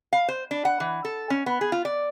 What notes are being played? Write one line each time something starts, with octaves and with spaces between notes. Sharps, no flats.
F5
C5
D4
F#5
E3
A4
C#4
B3
G#4
F4
D5